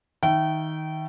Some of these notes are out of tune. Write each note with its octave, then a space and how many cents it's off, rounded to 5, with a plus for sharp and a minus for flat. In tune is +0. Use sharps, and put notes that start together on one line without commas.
D#3 +15 E5 +25 G5 -25